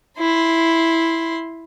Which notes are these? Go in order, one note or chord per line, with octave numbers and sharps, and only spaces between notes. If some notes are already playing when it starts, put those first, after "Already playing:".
E4 C6